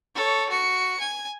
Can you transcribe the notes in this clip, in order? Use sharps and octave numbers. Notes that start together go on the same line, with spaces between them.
A4 C#5
F#4 C#7
G#5